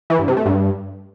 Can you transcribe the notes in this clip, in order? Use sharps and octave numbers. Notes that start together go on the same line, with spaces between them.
E3
G2
C3
A3
G2